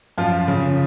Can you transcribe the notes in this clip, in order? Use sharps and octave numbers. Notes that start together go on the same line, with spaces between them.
F#2 F3 F4
C#3